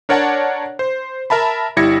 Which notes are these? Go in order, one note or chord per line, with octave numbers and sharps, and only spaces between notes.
D4 A#4 C#5 D5 F#5 A5
C5
A#4 E5 A5 B5
G1 G3 E4 G#6 A#6 C#7